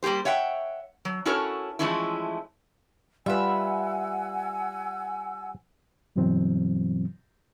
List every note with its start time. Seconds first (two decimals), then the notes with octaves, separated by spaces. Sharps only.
0.03 G3 A#3 B3 G4 C5
0.25 C#5 E5 F#5 G5
1.05 F#3
1.25 C#4 E4 F#4 A4 A#4 C#5
1.79 E3 F3 G#3 A3 C#4 E4
3.26 G3 F4 B4 E5 F#5 G#5 B5 E6
6.16 G2 B2 E3 F#3 C4